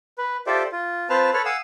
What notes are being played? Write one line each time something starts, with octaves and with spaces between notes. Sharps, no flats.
B4
F4 G4 A4 C5 D5 E5
F4
C4 F4 B4 C5 A5 F6
A4 B4 C#5 F6
F5 F#5 G#5 D#6 E6